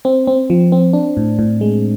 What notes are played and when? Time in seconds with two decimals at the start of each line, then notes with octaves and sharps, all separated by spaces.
0.05 C4
0.27 C4
0.50 F3
0.72 C4
0.93 D4
1.17 A2
1.39 A2
1.61 G#3